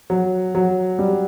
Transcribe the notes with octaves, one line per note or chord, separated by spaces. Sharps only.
F#3
F#3
G3